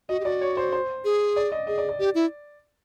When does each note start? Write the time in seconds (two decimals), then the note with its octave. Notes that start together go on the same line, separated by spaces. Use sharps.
0.09 F#4 D#5
0.20 G4
0.25 F#4 D5
0.41 C#5
0.57 C5
0.73 C5
1.04 G#4
1.36 D5
1.52 D#5
1.67 G#4 D#5
1.78 D5
1.89 D5
1.99 G4
2.15 E4